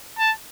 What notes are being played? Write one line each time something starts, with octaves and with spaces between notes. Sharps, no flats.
A5